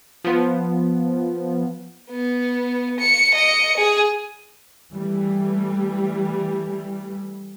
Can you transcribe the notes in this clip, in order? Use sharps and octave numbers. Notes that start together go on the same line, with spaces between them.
F3 B3
B3
C#7
D#5 C#7
G#4
E3 G3 A3